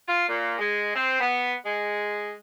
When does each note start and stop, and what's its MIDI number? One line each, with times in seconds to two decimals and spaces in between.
0.08 0.24 65
0.28 0.56 46
0.58 0.94 56
0.95 1.19 60
1.20 1.54 59
1.65 2.32 56